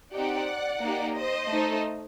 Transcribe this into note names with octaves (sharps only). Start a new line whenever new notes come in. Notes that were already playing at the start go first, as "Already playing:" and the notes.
C4 D#4 G4 D5 F#5
A#3 D#4 G4
C5 D#5
A3 D#4 A4